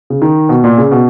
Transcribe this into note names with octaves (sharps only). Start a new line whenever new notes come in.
C#3
D#3
B2
A#2
C#3
B2